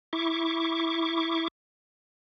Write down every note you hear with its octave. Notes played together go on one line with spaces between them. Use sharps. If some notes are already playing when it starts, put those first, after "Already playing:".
E4 C#6 D6